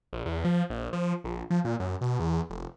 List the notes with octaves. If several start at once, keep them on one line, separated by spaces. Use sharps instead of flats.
A#1
E2
F3
A#1
F3
A#1
F3
A#2
F#2
B2
E2
F1